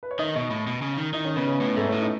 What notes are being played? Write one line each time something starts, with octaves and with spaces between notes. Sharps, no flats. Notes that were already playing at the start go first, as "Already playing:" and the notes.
B4
C#5
D#3 D#5
B2 D#5
A2
B2
C#3
D#3
D#3 D#4
C#4
C#3 B3
C#4
A2 B3
G#2 A3
C#4
A2 B3
D#4